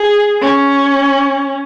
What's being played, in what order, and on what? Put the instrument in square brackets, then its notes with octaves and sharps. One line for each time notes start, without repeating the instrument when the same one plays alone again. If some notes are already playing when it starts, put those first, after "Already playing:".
Already playing: [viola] G#4
C#4